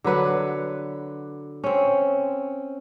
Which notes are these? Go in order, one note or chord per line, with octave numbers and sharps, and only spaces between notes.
D3 F#3 B4 F#5
C4 C#4